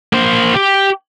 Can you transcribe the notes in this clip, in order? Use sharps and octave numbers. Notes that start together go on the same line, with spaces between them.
A#3 C5
G4